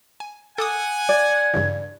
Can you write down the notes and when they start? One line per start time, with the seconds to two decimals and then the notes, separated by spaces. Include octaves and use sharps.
0.20 G#5
0.58 A4 F#5 G#5 D6 D#6
1.09 D5 G#6
1.54 G2 C#3 E3